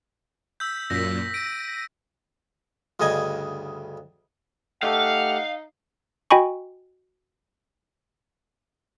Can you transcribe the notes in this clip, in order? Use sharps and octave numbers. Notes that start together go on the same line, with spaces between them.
E6 G6 B6
F#2 A#2 A#6 B6
A#6 D7 D#7
D2 G2 C#3 D#5 G#5
A3 D#4 G4 A4 F5 F#5
F#4 D#5 G5 G#5 B5 C#6